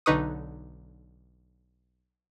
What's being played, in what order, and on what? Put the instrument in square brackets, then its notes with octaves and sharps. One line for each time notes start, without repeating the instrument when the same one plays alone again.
[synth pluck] B1 D3 D#4 B4 C#6 D#6